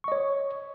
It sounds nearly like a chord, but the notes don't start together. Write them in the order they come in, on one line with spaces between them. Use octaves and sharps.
C#6 D#5 C#5